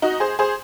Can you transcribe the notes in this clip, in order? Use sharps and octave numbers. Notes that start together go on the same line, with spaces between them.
D#4 F#4
G#4 C5
G#4 C5